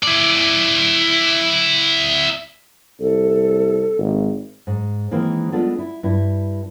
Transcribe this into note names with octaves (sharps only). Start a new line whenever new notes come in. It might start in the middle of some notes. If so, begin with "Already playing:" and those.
E4 D5
C2 A4
G#1
G#2
D#3 E3 G#3 A#3 C4
G3 G#3 B3 D4 F4 A4
E4
G2 E4